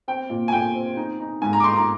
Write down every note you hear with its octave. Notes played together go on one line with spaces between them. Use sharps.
C4 G5
A#2
G#5
A#2 G5
C4
D#4
D#4
G#2 G#5
A#5
D6
D#4 C6
A#5